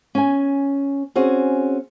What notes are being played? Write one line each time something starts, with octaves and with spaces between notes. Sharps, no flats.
C#4 G#5
C4 C#4 F#4 G#4